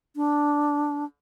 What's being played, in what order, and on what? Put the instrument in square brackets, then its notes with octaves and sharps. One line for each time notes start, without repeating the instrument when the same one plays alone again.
[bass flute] D4